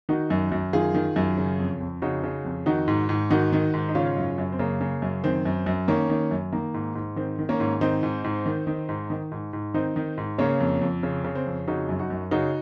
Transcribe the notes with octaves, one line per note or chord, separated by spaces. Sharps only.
D#3 D#4 F#4
F#2
F#2
D#3 F4 G#4
D#3
F#2
C#3
F2
F2
C#3 D#4 F#4
C#3
F2
D#3 D#4 F#4
G#2
G#2
D#3 D#4 F#4
D#3
G#2
D#4
C#3 C#4 F4
F#2
F#2
C4
C#3 A#3
C#3
F#2
D#3 C4
F#2
F#2
D#3 A#3 C#4
D#3
F#2
D#3 A#3
G#2
G#2
D#3 C4
D#3
A#3 C#4
G#2
D#3 C4 D#4
G#2
G#2
D#3
D#3
G#2
D#3
G#2
G#2
D#3 C4 D#4
D#3
G#2
C#3 A#3 C#4
F2
F2
C#3
C#3
C4
F2
C#3 D#4 F#4
F#2
D#4 F#4
F#2
C#3 D#4 F#4